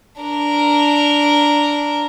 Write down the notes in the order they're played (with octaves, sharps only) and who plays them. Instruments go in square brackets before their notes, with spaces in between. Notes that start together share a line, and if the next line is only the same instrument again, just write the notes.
[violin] D4 A#4